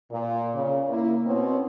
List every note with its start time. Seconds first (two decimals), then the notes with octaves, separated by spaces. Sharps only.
0.11 A#2
0.54 C#3
0.89 A#3 E4
1.25 B2 C4 C#4